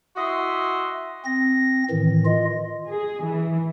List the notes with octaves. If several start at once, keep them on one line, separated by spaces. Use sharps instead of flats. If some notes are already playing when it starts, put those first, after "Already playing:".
E4 F#4 D#5 E5 C6
C4 A#6
A2 D#3 E3
F4 D#5
G#4
E3